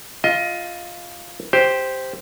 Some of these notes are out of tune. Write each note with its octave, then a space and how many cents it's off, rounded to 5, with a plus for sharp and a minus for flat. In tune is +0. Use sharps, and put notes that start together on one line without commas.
F4 +0 D#5 +20
G4 +0 C5 +0